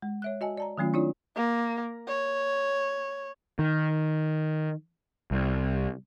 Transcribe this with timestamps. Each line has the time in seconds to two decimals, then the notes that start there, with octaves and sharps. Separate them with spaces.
0.02 G#3
0.22 C#5 E5 F#6
0.41 F#4 D#5 G#5 A5
0.58 D5 A5 A#5
0.78 D#3 F#3 A3 C#4 F4
0.93 C4 D4 E4 F4 C#5 D5
1.36 A#3
2.07 C#5
3.59 D#3
5.31 C2